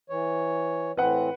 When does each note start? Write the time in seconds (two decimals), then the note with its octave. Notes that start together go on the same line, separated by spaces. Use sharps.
0.10 E3 C#5
0.97 A2 E3 C4 B4 F#5